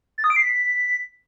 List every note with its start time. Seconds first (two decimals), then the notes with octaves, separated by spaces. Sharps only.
0.18 A6
0.24 D#6
0.30 D7
0.36 C7
0.43 B6